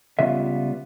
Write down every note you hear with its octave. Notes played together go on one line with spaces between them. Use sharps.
C#2 C#3 G3 B3 F4 E5